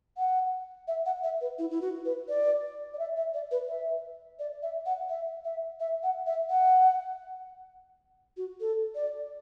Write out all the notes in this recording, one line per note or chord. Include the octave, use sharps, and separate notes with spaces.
F#5
E5
F#5
E5
B4
E4
E4
F#4
B4
D5
D5
E5
E5
D5
B4
E5
D5
E5
F#5
E5
E5
E5
F#5
E5
F#5
F#4
A4
D5